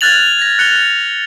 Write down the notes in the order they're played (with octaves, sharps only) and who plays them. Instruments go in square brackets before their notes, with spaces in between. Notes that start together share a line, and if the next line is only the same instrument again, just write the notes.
[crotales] F6 F#6 G#6 A6 F7 F#7
G#6 A#6
F#6 C#7 F7 G7